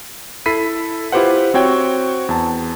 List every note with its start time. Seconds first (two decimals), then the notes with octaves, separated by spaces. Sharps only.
0.46 E4 A4 B5 B6 C7 D#7
1.12 E4 F4 G4 B4 C5 F#5
1.54 C4 F#4 C#5 G5
2.29 E2 A5